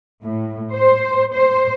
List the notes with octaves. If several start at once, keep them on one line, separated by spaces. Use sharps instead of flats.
A2
C5
C5